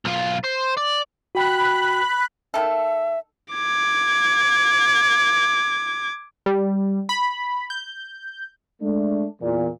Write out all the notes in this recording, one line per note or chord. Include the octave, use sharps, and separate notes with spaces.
B1 F4
C5
D5
F#4 G5 B5 F#6
D#3 A4 E5
D6 G#6
G3
B5
G6
G#3 A3 D4
E2 A#2